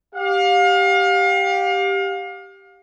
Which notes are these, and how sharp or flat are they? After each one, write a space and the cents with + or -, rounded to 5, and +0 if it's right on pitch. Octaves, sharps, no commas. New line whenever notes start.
G4 +0 F5 +35